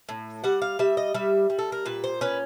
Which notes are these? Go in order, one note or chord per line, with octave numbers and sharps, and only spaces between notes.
A2
G3 F#5
F5
G3 E5
D#5
G3 E5
G3
A4
A#4
A#2 B4
C5
C#4 B4